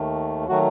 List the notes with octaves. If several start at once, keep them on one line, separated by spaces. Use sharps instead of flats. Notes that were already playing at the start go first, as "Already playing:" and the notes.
Already playing: D#2 D#3 A3
D#3 F#3 A3 F#4